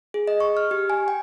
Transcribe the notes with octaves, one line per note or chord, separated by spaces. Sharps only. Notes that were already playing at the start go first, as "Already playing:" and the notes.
G#4
D#5
C#6
F6
G4
G#5
G5